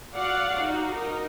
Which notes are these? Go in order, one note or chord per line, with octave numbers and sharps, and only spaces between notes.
F#4 D5 F5 F#5
D#4 F#4
D#4 A#4